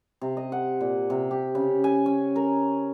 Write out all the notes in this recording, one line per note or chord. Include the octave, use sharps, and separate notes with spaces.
C3
D#5
F#5
A#2
C3
G4
C#3
G#5
C#4
A#4